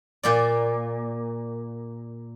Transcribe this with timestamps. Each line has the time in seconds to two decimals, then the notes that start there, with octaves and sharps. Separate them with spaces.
0.23 A#2 A#3 D5